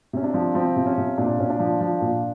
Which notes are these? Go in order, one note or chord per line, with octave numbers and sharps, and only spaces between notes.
C3 C#4
D4
F3
F3 C4
C3
C#4
C3
A#2 D4
A#2 C#4
D4
F3
F3
A#2